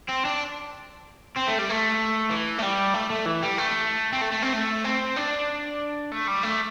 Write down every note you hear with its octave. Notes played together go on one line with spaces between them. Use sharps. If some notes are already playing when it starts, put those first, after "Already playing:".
C4
D4
C4
A3
G3
A3
E3
A3
G3
A3
A3
E3
G3
A3
C4
A3
A3
C4
A3
C4
D4
A3
G3
A3